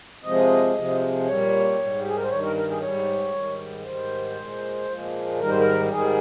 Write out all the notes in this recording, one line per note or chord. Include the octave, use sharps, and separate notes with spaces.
C3 F3 G#3 D#5
C3 F3 G#3
A#2 G3 C#5
G#2 G3
G4
G#4
A#4
C5
G2 D#3 G3 C#5
A#4
A#4
G#4
G#2 G3 C#5
G#2 D#3 G3
G#2 D#3 G3 C5
A#2 G#3
A#2 F3 G#3
G#2 D#3 G3 A#4
C5
A#4
G#2 D#3 G3 G#4